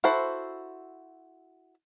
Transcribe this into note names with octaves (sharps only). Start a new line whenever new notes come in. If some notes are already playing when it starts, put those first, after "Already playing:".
E4 F#4 A4 C5